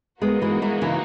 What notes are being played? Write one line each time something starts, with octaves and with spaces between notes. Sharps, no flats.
G#3 A#3 B3 D#4 F#4
E3 G#3
E3 G#3
C#3 E3